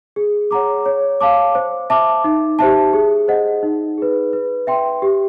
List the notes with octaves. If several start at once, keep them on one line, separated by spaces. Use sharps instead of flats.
G#4
C#5 F#5 A#5 D6
C#5
F5 A5 D6
C5
E5 A5 D6
D#4
G4 C5 E5 A5
G#4
C5 D#5 F#5
D#4
G#4 B4
B4
E5 G5 C6
G4